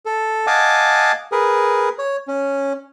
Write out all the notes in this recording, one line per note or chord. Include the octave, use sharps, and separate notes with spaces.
A4
D#5 F5 F#5 G#5 A5 D6
G#4 A#4 B4
C#5
C#4